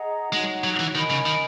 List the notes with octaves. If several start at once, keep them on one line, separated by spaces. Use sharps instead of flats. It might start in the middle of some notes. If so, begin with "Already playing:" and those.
Already playing: G#4 D#5 F#5 A#5
G#3 D#4 F#4 C#5 F#5
F#3
E3
D#3 A#4 D#5 G#5 B5
C#3
D#3